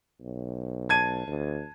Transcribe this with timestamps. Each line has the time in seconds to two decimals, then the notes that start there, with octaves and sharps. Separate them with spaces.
0.21 B1
0.89 A5 G#6 D#7
1.27 D2